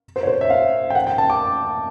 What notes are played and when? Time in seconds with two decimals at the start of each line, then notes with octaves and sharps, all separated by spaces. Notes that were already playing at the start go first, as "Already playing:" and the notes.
0.16 C5
0.23 C#5
0.27 C5
0.41 E5
0.50 F5
0.90 G5
0.95 F#5
1.07 G5
1.18 A5
1.30 D6